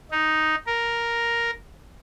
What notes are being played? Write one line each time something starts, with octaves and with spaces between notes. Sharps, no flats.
D#4
A#4